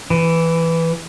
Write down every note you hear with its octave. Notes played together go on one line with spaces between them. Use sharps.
E3